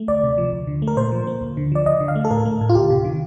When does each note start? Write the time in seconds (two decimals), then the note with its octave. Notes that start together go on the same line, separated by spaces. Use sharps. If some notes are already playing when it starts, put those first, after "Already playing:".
Already playing: A3
0.08 D2 D5
0.23 C3
0.38 F3
0.52 D2
0.67 D3
0.82 A3
0.87 A#4
0.97 A#2 C5
1.12 F3
1.27 A#3
1.41 D2
1.57 D3
1.72 F3 D5
1.86 D2 D#5
2.01 D3
2.08 F5
2.15 A3
2.25 A4
2.30 A2 A#4
2.45 A3
2.61 A2
2.69 F4
2.75 D2 G4
2.90 C3
3.05 D#3